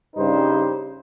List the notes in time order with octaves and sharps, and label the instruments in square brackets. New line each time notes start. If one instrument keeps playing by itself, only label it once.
[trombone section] G2 C#3 G3 D#4 B4 C5